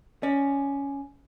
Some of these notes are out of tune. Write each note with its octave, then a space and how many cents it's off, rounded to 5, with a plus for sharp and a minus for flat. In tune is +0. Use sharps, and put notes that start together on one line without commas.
C#4 +10 D5 +25